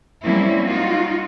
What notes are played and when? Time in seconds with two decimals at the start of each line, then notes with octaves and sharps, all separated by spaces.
0.23 F#3 G3 A#3 C4 C#4 E4
0.67 D#4 F4 F#4